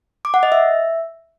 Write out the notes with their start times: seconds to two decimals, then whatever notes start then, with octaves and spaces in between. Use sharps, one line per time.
0.25 D6
0.34 F#5
0.43 D#5
0.52 E5